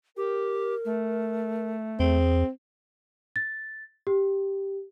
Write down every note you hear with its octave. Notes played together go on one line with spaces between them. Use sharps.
G4 A#4
A3
E2 C4 G#4
A6
G4